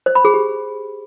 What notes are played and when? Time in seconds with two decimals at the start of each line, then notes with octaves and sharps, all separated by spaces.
0.06 C5
0.15 B5
0.25 G#4
0.34 G4